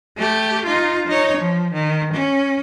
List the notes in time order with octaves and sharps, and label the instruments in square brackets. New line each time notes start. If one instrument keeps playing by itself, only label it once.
[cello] A3 G4
D#4 F4
D#4 C#5
F3
D#3
C#4